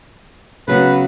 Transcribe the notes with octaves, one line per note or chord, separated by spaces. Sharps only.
C#3 F#3 B3 B4